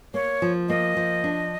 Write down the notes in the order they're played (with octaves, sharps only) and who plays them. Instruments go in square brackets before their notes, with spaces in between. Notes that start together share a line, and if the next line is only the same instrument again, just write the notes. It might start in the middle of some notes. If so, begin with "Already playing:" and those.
[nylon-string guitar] A#3 [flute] C#5
[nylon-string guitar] F3
[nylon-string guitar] A#3 [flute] D#5
[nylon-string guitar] F3
D4